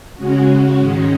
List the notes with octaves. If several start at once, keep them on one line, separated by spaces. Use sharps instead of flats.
C#3 G#3 C#4 F#4
G#2 D#3 G#3 C#4